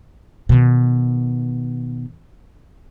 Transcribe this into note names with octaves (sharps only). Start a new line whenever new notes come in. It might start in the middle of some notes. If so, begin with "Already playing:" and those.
B2 D#3